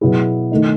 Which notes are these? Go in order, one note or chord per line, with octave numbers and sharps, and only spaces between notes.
B2 F#3 B3 E4 G#4
D#3 A3 D#4